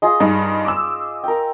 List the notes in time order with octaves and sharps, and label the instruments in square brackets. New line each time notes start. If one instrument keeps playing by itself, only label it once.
[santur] F4 G#4 D#5
[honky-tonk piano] G2 D#4 [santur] D#5
[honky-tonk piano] D6 E6
[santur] A#4 G5